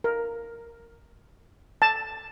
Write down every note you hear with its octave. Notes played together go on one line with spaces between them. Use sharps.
A#4
A5